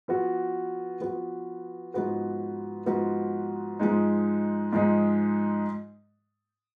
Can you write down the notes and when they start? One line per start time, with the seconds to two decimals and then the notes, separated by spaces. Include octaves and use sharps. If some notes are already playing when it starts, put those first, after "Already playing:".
0.08 F3 B3 F#4
1.01 F3 B3 F#4
1.94 G#2 F3 B3 F#4 B4
2.86 G#2 F3 B3 F#4 B4
3.80 G#2 F3 G#3 D#4
4.73 G#2 F3 G#3 D#4